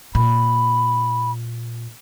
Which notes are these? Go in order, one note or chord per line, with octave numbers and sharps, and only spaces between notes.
A#2 B5